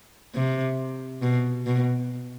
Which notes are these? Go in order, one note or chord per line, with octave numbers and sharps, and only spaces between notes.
C3
B2
B2